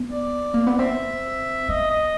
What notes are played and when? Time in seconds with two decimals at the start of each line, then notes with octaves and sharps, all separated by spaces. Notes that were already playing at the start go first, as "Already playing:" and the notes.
Already playing: B3
0.12 D5
0.54 A#3
0.66 B3
0.79 C4 E5
1.69 B3 D#5
1.90 D#5